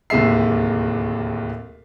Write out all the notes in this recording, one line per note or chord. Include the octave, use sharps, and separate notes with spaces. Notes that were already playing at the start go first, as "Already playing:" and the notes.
D1 D#2 C3 G#3 E5 C7